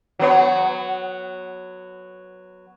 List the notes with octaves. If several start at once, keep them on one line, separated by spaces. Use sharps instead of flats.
F#3 B3 C#5